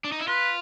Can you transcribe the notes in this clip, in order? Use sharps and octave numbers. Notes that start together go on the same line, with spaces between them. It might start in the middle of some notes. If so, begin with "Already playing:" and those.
D4
D#4
E4
F4 B4